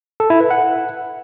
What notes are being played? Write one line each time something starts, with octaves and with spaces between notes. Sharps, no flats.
A4
E4
B4
F#5